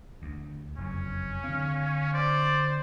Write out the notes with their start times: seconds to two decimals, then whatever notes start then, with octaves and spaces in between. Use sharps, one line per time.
0.22 D2
0.78 F#1 F2 C#4
1.44 D3 C4 F5
2.14 C5 D5